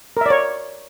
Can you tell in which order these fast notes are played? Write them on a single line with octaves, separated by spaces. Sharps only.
A#4 E5 D5 C#5